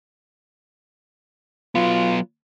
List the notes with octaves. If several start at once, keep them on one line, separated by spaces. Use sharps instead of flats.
F#3 B3 F4